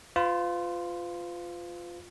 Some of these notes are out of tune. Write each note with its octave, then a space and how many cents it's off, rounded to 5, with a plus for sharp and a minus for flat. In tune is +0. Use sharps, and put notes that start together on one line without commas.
F4 +0 B4 +45